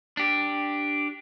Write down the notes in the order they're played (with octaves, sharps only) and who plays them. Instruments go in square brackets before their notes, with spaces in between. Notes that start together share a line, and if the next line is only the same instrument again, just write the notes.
[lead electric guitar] D4 G4